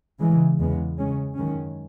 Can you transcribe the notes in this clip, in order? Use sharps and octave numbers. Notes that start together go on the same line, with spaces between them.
C#3 E3 G#3
E2 C#3 G#3 B3
C#3 G#3 C#4
F#2 D#3 G#3 C#4